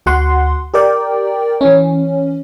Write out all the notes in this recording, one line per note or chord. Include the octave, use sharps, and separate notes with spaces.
D2 F#4 F#5 C6
G4 A#4 D5 G5
E3 C#4